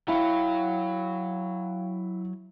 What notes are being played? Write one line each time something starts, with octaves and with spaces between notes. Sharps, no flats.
F#3 E4 F5 G5 B5